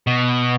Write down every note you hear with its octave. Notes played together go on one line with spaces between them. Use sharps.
B2